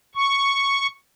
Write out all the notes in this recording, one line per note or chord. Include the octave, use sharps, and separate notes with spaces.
C#6